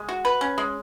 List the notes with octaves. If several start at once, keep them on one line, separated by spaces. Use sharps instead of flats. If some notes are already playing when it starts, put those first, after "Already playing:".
Already playing: G#3
F#4
B4
C#4
G#3